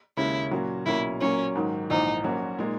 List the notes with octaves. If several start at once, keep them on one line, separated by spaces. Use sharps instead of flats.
D#2 C#3 G#3 C#4 E4
A#2 F#3 C#4 F#4
B1 A#2 A#3 C#4 E4
A#2 F#3 A#3 C#4
G#2 D#3 F#3
A#1 G#2 E3 D#4
A#1 A#2 F#3 C#4 F#4
A#2 G#3 D#4